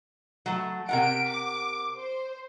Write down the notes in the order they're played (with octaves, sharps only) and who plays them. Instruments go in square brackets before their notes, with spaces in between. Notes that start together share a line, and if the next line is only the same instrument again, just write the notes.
[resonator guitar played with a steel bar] F#3 A3
[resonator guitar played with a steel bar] C3 A#4 F#5 [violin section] D7
[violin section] D6
C5